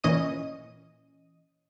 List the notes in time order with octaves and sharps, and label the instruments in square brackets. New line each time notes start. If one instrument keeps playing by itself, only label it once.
[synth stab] A#2 E3 C#4 D#5 D#6 D#7